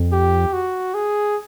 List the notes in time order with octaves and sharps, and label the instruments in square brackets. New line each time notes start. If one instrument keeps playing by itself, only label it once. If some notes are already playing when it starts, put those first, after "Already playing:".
Already playing: [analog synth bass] F2
[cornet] G4
F#4
G#4